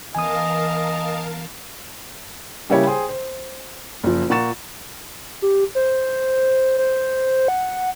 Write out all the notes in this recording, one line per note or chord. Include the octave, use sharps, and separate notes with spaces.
E3 B3 A#4 D#5 F5 G#5 A5 D#6
C#3 G3 A#3 E4 G4 C#5
G#4 C5 G5 C6
C5
F#1 F3
A#2 F#5 A#5 C#6 A6 E7
G4
C5
C5
F#5